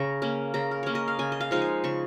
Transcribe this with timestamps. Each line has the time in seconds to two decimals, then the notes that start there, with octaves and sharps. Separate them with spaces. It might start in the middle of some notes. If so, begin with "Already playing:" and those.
Already playing: C#3 A#5 C#6
0.22 A#3 C#4
0.54 C#3 A#5
0.71 A#4
0.83 A#3 C#4 C#5
0.95 D#5
1.08 F5
1.19 C#3 G#5
1.32 D#5
1.40 F5
1.51 F3 G#3 D#4 F5
1.62 G#5
1.84 C#3 C#6